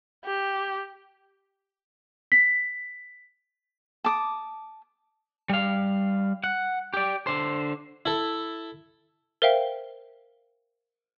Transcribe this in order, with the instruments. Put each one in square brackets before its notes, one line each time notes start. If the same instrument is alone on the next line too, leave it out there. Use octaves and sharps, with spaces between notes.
[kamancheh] G4
[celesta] B6
[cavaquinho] A5 D6 D#6
[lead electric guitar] G3 F5
F#5
G4 D5
D3 C5
[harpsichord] E4 A4
[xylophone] A#4 C5 E5 F5 G5